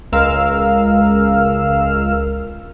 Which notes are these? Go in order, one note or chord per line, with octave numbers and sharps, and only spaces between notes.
C#2 G#3 A#4 F5 E6 F6